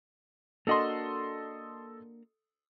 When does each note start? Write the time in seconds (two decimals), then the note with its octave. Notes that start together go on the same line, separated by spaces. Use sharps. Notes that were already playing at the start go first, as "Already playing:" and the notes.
0.67 A#3 D4 F#4 A4 D#5 C6